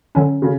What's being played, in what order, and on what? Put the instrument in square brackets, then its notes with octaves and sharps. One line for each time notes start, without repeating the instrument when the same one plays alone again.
[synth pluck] D3 F#3 C#4
[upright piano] C#3